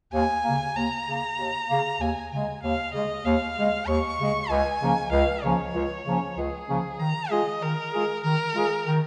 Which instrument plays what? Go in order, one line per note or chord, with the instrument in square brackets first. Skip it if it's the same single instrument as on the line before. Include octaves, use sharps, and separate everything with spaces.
[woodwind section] D#2 [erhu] G#5
[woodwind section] C#3 A#3
[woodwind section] D#2 [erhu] A#5
[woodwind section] C#3 A#3
D#2
C#3 A#3
[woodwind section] D#2 [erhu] G#5
[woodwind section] C#3 G#3 [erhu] G#5
[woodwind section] D#2 [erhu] F5
[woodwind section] C#3 G#3 [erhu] D#5
[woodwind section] D#2 [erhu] F5
[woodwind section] C#3 G#3
[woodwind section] D#2 [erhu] C#6
[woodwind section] C#3 G#3
[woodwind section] C#2 [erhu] G#5
[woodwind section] C#3 F3 A#3 C#4
[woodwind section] C#2 [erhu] F5
[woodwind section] C#3 F3 A#3 C#4 [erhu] C#5
[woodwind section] C#2
C#3 F3 A#3 C#4
[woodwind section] C#2 [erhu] G#4
[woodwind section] C#3 F3 A#3 C#4
[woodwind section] D#3 [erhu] A#5
[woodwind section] G#3 F4 G#4 [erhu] D#5
[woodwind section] D#3 [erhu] A#4
[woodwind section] G#3 F4 G#4
[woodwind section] D#3 [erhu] A#4
[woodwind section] G#3 F4 G#4
D#3